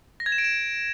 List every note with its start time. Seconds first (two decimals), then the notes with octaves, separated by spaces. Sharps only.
0.20 A#6
0.26 G#6
0.32 E7
0.38 D7
0.44 E7